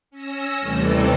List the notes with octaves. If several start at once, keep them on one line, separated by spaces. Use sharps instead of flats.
C#4 E6 A#6
D#2 C3 E3 G3 A3 A4